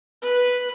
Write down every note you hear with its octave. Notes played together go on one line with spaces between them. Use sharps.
B4